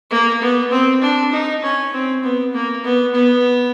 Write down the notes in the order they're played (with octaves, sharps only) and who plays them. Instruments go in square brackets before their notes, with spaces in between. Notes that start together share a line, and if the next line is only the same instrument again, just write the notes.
[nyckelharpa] A#3
B3
C4
D4
D#4
C#4
C4
B3
A#3
B3
B3